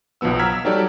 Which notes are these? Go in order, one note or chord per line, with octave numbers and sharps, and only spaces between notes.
B1 B2 F3 B3 E6
A#5 E6 F6 G#6 B6
E6
F#3 G3 D#4 G4 A4 D5